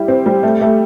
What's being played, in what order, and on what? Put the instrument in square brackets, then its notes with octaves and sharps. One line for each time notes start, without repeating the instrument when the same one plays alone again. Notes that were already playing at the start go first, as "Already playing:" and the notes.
Already playing: [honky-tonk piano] G3 E4
C4
G3
A3
A3